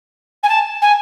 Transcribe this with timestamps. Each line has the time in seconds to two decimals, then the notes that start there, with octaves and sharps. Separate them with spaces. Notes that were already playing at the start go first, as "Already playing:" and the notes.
0.43 G#5
0.49 A5
0.82 G#5